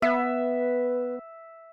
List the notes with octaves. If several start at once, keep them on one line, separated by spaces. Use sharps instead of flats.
B3 B4 E5